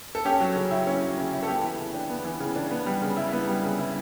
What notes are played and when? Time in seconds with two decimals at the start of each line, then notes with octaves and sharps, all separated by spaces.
0.15 A4
0.25 C#4 G4
0.40 F#3
0.56 C#3
0.71 E4
0.87 C#4
1.02 F#3
1.18 C#3
1.33 E4
1.42 A4
1.48 B3 G4
1.63 E3
1.78 C#3
1.94 D4
2.10 B3
2.24 E3
2.40 C#3
2.56 D4
2.71 B3
2.86 G3
3.02 C#3
3.17 E4
3.32 B3
3.48 G3
3.63 C#3
3.78 E4